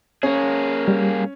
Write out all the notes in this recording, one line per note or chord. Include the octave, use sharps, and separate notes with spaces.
A#3 C#4 G#4
G3